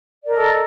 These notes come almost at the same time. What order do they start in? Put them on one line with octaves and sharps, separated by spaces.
D5 A#4 D#5 A4